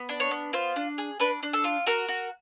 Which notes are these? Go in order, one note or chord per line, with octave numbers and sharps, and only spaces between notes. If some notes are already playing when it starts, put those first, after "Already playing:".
Already playing: B3
D4
C#5
B3
F4 C5
D4
G#4
D4 B4
D4
A4
F4
F#4 A#4
F#4